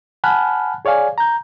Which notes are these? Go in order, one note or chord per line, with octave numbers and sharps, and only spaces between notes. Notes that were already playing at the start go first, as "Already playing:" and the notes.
F#5 G#5 A5 B5 F6 F#6
G#4 C#5 D5 F5 G#5
A#5 G6